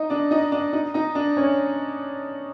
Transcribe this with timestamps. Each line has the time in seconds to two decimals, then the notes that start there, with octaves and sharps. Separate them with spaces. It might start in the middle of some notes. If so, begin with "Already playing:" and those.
Already playing: D#4 D#5
0.10 D4 D5
0.31 D#4 D#5
0.52 D4 D5
0.73 D#4 D#5
0.94 D#4 D#5
1.15 D4 D5
1.37 C#4 C#5